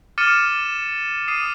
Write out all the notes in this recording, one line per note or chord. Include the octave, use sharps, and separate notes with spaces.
D6 F6 A6 C#7 D#7 E7
D#6 C7 D#7